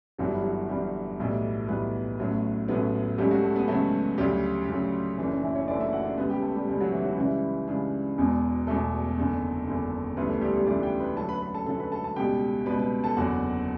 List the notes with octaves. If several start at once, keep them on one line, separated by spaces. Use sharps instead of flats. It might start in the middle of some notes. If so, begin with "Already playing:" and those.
G1 G2 E3 F#3 G3 F#4
E3 E4
F#3 F#4
G1 G2 E3 G3
B1 A2 E3 G3
B1 A2 E3 G3 B3 B4
A1 A2 F#3 A3
A1 A2 F#3 A3 B3 B4
C#2 C#3 F#3 G3 A3 G4
F#3 F#4
A3 A4
B3 B4
C#2 C#3 F#3 A3 A4
D2 C#3 F#3 G3 G4
D2 C#3 F#3
F#1 F#2 E3 A3 D4
C#4
E3 E4
C#4 C#5
F#1 F#2 E3 A3 D4 D5
E4 E5
F#4 F#5
D4 D5
C#2 C#3 G3 B3 B4
G4 G5
A3 A4
G3 G4
C#2 C#3 G3
F#3 F#4
E3 E4
F#3 F#4
C#2 C#3 E3 G3 E4
C#2 C#3 G3 D4
E1 E2 B2
E1 E2 B2 A3 A4
F#1 E2 D3
F#1 E2 D3
D2 C#3 E3 G3 B3 B4
A3 A4
G3 G4
G3 G4
D2 C#3 E3 G3 D4 D5
G4 G5
B4 B5
F#2 D3 F#3 A3 A4 A5
B4 B5
B4 B5
A4 A5
F#2 D3 F#3 A3 A4 A5
B4 B5
A4 A5
A4 A5
C#2 B2 G3 G4 G5
C#2 B2 G3 B4 B5
B4 B5
A4 A5
F#1 E2 D3 F#3 F#4 F#5